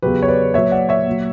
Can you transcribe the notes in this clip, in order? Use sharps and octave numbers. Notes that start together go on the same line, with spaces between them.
E2 C#3 F#3 G4 B4
C#5
B4 D5
A#2 F#3 C#5 E5
D5 F#5
C#5 E5
A#2 F#3